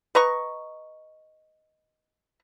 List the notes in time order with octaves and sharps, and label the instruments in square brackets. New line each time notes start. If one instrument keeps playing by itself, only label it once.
[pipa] B4 D#5 A#5 C#6